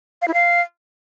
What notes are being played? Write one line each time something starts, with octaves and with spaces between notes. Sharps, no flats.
F5
E4
F5